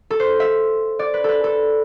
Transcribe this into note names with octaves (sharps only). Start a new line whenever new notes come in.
A4
C5
E5
D5
B4
A4 B4
A4